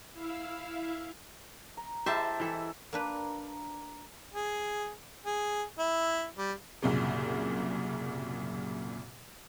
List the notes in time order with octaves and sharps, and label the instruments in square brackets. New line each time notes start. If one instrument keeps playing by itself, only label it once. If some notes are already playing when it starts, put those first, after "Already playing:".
[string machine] E4 E5 F5
[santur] A#5
[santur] G#3 E4 E6 [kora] G4 C5 [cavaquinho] E5 G5 A5
[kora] E3 A4
[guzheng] A#3 D4 B4 [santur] A#4 D5 A#5
[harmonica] G#4
G#4
E4
G3
[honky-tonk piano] C2 F#2 A#2 C#3